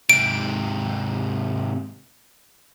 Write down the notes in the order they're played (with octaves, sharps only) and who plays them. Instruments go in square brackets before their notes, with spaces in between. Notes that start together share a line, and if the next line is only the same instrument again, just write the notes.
[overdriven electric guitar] G#2 C3 [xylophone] D7